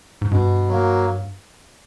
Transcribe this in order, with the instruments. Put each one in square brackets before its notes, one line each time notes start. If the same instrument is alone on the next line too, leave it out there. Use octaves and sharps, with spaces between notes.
[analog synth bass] G#2
[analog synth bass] G2 [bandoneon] B2
[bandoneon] F#3 A#3